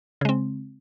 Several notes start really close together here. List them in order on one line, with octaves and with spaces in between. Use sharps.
C#3 G#3 C4